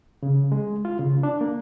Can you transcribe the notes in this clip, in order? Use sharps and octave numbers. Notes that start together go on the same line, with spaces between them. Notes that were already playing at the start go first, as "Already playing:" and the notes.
C#3
G#3
F4
C#3
D4
A#3